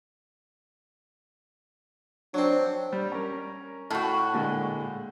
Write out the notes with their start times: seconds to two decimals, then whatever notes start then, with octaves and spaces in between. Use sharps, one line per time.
2.34 F#3 C4 D4
2.93 G3
3.12 C#4 A#4
3.90 A2 F#4
4.33 A#2 D3 G#3